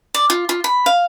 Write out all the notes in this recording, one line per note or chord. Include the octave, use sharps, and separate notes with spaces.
D5
F4
F4
B5
F5